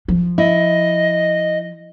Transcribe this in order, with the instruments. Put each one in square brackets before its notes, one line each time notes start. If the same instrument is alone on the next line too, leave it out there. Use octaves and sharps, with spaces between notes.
[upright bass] F3
[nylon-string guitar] E4 [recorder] D#5